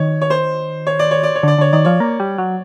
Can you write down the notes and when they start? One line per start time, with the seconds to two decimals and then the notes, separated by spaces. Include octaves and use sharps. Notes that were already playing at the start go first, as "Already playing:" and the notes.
Already playing: D#3 C#5
0.21 C#5
0.30 C5
0.87 C#5
0.99 D5
1.11 C#5
1.23 D5
1.35 C#5
1.43 D3 D5
1.58 D3 C#5
1.73 D#3 D5
1.85 F3 C#5
2.00 A#3
2.20 G3
2.38 F#3